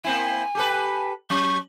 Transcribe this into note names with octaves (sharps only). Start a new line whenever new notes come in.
A#3 C4 E4 G#5
G4 A4 B4
F#3 C#4 C#6